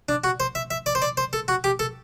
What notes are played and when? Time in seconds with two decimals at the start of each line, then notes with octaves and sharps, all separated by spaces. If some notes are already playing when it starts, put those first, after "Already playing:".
0.09 D4
0.24 F#4
0.40 C5
0.55 E5
0.71 E5
0.86 D5
0.95 C5
1.02 D5
1.17 C5
1.33 A4
1.48 F#4
1.64 G4
1.79 A4